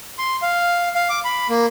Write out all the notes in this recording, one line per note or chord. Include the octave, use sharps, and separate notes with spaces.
C6
F5
F5
D6
B5
A#3